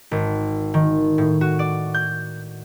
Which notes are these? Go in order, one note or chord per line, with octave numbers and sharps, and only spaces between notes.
G#1
D#3
A2
F#4
D5
G6